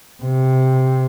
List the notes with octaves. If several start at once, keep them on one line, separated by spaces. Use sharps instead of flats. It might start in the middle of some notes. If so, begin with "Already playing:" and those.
C3